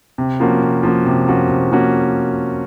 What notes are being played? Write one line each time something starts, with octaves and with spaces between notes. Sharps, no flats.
C3
F3 A#3 C#4 F#4
C3
F3 A#3 C#4 F#4
C3
F3 A#3 C#4 F#4
C3
F3 A#3 C#4 F#4